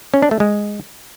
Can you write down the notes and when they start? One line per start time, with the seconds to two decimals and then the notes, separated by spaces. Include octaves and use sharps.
0.14 C#4
0.22 D4
0.31 A3
0.40 G#3